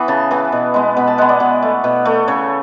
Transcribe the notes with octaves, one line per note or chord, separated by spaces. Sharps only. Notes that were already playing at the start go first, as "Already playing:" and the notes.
Already playing: E3 B3 B5
C#3 A5
E3 B3
B2
G#3 B3
B2 B5
A5
G#3 B3 F#5
D5
B2
A3
B2
A3
C#3 C#5